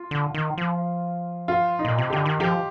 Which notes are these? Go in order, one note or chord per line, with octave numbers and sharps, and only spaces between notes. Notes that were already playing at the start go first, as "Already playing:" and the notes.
Already playing: F4
D3
D#3
F3
F4
D#4
A#2
C3
D3 G4
D#3
F3 G4